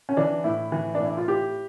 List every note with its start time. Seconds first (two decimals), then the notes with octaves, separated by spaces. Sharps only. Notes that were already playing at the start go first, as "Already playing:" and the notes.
0.09 C#4
0.17 E3 D4
0.44 A2 E4
0.72 E3
0.95 D4
1.00 A2
1.06 E4
1.17 F4
1.27 A2 G4